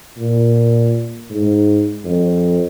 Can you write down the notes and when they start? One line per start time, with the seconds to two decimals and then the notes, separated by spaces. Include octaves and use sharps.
0.18 A#2
1.30 G#2
2.04 F2